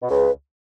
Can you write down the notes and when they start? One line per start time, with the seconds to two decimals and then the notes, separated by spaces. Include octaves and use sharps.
0.02 B2
0.10 C#2 C#3 B4